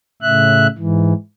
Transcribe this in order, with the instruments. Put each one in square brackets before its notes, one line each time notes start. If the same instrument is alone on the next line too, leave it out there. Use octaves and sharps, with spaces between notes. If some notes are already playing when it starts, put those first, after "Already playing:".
[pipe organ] A2 C#3 E5 F#6
G#2 E3